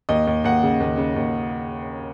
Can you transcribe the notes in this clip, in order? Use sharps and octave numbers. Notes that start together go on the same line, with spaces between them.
D#2 D#5
D#2
D#2 F#5
C#3
D#2
C#3
D#2